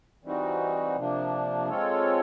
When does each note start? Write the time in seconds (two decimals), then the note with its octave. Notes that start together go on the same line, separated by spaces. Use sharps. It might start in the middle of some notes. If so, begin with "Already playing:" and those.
0.23 E3 G3 C4 D#4 F#4
0.96 C3 F3 A#3 D4
1.69 G#3 C4 F4 A4 C#5